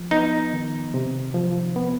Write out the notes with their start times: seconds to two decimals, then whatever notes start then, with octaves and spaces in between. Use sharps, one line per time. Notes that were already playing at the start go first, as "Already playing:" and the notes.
Already playing: F3
0.11 B3 D#4
0.53 D#3
0.94 C3
1.34 F3
1.76 B3